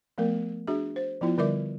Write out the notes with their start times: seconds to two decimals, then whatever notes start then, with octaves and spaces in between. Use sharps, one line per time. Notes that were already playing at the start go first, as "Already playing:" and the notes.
0.18 F3 A3 B3 A#4
0.67 D4 F#4 G#4 E5
0.96 C5
1.21 F3 B3 E4 F4
1.38 D3 G3 A#4 D5 E5 D6